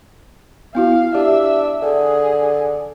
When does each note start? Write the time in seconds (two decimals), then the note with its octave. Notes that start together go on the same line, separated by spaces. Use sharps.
0.75 B3 E4 F#4 F5
1.14 D4 G4 E5
1.82 D3 G#4